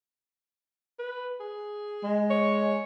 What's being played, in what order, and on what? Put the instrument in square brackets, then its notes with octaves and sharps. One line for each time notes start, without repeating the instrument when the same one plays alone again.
[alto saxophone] B4
G#4
[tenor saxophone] G#3
[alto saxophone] C#5